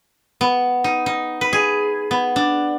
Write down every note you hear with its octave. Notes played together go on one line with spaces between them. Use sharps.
B3
D#4
D#4
B4
G#4
B3
D4